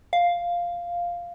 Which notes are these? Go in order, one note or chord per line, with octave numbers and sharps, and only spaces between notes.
F5